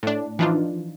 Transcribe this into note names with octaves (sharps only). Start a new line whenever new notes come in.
A2 D4
E3 F3 D4 D#4 F4